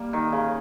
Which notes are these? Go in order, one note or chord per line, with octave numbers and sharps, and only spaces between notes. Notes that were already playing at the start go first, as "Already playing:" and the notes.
Already playing: G3 A#3
D#3
C#3